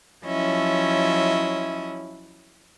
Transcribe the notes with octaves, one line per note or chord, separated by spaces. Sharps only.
F3 F#3 C#4 E4 D#5 E5